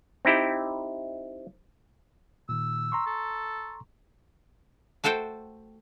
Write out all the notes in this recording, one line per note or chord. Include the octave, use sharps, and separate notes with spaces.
C4 D#4 E4 G4 G5
A#2 D#3 E6
A#5 C6 C#6
A4
A3 F#4 A4 C5 G5